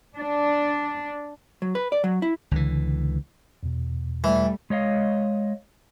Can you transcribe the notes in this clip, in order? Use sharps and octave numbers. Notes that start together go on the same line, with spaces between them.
D4
F#3
B4
D5
F#3
E4
C#2 D3 E3
E2 B2
E3 G3 A3
G#3 C#5 D#5 F5